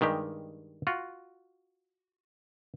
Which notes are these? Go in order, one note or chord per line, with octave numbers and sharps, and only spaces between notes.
G2 D#3 G#3 G4
F4 F#4